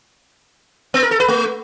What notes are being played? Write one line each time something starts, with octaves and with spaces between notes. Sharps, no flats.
B3
A#4
A4
B4
A3